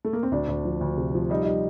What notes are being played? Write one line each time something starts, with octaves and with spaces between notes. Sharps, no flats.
A3
A#3
C4
D2 D4
D2
F3
D2
C3
F3
G3 D#4
G3 D#4